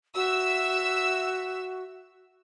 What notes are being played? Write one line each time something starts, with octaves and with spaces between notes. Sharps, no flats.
F#4 E5 E6